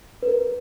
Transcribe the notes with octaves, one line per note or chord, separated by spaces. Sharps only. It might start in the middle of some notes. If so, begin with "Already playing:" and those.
B4
A#4